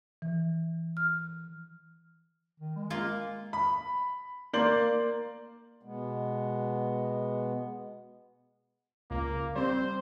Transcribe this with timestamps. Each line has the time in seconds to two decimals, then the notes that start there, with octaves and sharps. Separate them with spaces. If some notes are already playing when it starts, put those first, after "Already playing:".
0.22 E3
0.97 F6
2.60 D#3
2.76 G#3
2.90 A#3 F4
3.53 B5
4.53 A#3 D5 C6 G6 F#7
5.82 B2 G#3 B3
9.11 C#2 A#3
9.56 G3 C4 C5